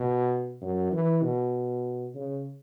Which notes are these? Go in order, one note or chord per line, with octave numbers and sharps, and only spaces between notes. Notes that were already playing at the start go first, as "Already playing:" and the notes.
Already playing: B2
F#2
E3
B2
C#3